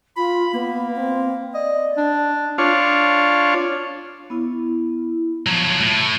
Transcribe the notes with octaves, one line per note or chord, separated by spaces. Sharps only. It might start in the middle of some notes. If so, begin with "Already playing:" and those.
F4 B5
A#3 B3
C4
D5 D#5
D4
D4 F4 C#5
B3 E4
F3 F#3
A2